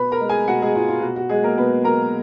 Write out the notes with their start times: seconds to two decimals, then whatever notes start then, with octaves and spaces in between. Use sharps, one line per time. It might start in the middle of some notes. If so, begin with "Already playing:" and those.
Already playing: B2 B4 B5
0.12 A#4 A#5
0.21 G#3
0.29 G#4 G#5
0.48 B2 F#4 F#5
0.62 G#3 G#4
0.75 G#3 F4
0.88 F4
1.02 B2 F#4
1.16 F#4
1.29 F#3 G#3 G#4
1.43 A#3 A#4
1.57 B2 B3 B4
1.84 F#3 A#4 A#5